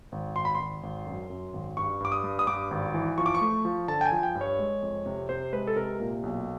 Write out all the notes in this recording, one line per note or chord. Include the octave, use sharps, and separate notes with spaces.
G#1
G#1 C6
B5
G#1 C6
G#1
F#2
F#2
G#1
G2 C#6
G2 D6
D#6
G2
D#6
G2 D6
G#1
E3
F3 C#6
D6
C#6
A3
F3
D3 A5
G5
G#5
F3
G5
G2
C#5
G#3
F2
C3
C3 C5
G#3 B4
A4
C3 A#4
A#2
B1